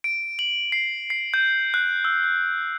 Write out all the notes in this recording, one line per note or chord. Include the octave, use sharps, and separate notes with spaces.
D7
F#7
C7
C7
G6
F#6
E6
E6